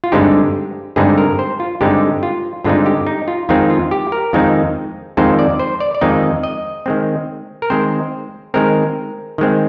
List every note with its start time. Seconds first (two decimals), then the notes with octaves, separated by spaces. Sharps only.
0.04 F4
0.12 G2 D3 G#3 C4 D#4 G4
0.96 G2 D3 G#3 C4 D#4 G#4
1.18 A#4
1.39 C5
1.60 F4
1.81 G2 D3 G#3 C4 D#4 G4
2.23 F4
2.64 G2 D3 G#3 C4 D#4 F4
2.86 G4
3.07 D#4
3.28 F4
3.49 F2 D#3 G#3 C4 D#4 F4
3.70 F4
3.91 G4
4.12 A#4
4.33 F2 D#3 G#3 C4 D#4
5.17 F2 D#3 G#3 C4 D#4 C5
5.39 D5
5.59 C5
5.80 D5
5.95 D5
6.01 F2 D#3 G#3 C4 D#4 D#5
6.43 D#5
6.86 D#3 G#3 C4
7.62 A#4
7.70 D#3 G#3 C4 C5
8.54 D#3 G#3 C4 A#4
9.38 D#3 G#3 C4